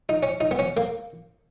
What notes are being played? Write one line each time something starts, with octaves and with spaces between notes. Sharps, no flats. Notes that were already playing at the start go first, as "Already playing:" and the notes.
D#4
C#4
D#4
B3
C#4
A#3